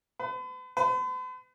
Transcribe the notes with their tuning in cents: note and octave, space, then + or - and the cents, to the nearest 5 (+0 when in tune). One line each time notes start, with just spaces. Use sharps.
B4 +40
B4 +45